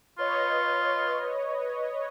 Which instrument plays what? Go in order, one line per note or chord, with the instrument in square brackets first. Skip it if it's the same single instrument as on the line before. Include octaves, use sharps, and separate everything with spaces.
[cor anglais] F4 [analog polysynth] B4 C#5 D#5